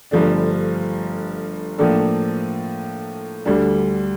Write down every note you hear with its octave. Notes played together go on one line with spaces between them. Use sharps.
G1 G2 F3 A3 D4
A2 F3 A#3 D4 A4
D2 D3 G3 D4